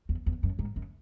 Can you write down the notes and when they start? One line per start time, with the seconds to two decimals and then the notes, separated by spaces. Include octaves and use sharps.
0.09 E2
0.26 E2
0.43 F#2
0.59 G#2
0.76 F#2